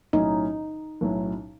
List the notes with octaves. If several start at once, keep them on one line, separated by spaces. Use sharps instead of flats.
B1 A2 F#3 C#4 D#4 E4
B1 A2 F#3 C#4 E4